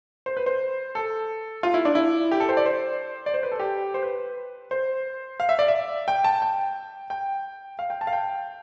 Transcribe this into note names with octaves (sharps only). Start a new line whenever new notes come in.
C5
B4
C5
A4
F4
E4
D4
E4
G4
A4
C5
D5
C5
D5
C5
B4
A4
G4
C5
B4
C5
F5
E5
D5
E5
G5
A5
G5
G5
F5
G5
A5
F5
G5